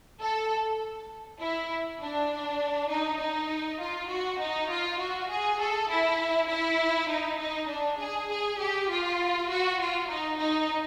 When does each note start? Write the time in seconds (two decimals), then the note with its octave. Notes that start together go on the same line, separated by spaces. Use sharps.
0.21 A4
1.41 E4
2.00 D4
2.90 D#4
3.20 D#4
3.81 F4
4.10 F#4
4.40 D#4
4.70 F4
5.00 F#4
5.30 G#4
5.60 A4
5.90 E4
6.49 E4
7.09 D#4
7.40 D#4
7.69 D4
7.99 G#4
8.30 G#4
8.59 G4
8.90 F4
9.49 F#4
9.80 F4
10.09 D#4
10.39 D#4